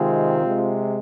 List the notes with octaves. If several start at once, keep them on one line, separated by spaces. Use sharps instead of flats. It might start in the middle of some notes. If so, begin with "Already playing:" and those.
Already playing: C3 D#3 G#3 C4 F4
C3 G#3